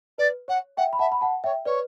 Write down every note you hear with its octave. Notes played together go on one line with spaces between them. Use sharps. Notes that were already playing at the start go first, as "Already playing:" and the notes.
B4 D5
C#5 F#5
E5 F#5 G5
B5
E5 F#5 A5
B5
F#5 A5
C#5 E5 G5
B4 C#5 D5